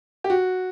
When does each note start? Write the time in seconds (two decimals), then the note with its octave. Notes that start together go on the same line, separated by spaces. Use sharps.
0.24 G4
0.30 F#4